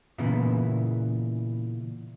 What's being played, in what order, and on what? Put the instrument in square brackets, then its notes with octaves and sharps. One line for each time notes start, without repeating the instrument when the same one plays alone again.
[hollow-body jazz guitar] A#2 C#3 E3 B3 E4